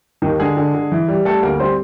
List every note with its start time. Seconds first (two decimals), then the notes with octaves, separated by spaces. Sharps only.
0.22 D#2 D#3 D#4
0.40 D3 G#3 G#4
0.57 D3
0.74 D3
0.92 E3
1.08 G3
1.25 G3 A3 A4
1.43 D2 A#3 A#4
1.59 G3 C4 C5